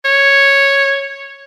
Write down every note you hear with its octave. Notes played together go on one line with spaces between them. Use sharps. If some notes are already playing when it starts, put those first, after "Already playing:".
C#5